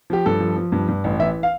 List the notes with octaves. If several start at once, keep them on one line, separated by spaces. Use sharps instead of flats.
F3 G4
G2 A4
F3
F3
G2
G2
A1
E3 E5
F5